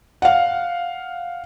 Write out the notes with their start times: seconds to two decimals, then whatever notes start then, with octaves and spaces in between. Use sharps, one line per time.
0.22 F5 F#5